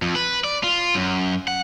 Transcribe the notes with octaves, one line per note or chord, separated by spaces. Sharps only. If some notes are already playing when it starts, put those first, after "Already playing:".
F2
B4
D5
F4
F#2
F#5